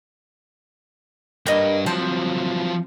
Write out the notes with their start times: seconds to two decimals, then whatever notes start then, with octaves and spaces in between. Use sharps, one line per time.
1.47 G2 A#3 D#5 G5
1.86 F3 F#3 C4 A5